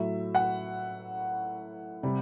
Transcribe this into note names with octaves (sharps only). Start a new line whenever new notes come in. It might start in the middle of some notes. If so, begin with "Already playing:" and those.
Already playing: A2 F#3 E5
F#5
C3 G3